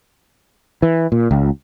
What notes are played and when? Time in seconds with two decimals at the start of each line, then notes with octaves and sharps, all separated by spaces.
0.82 E3
1.12 A#2
1.31 C#2